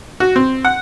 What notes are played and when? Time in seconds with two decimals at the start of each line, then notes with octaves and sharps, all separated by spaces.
0.20 F#4
0.36 C4
0.65 F#5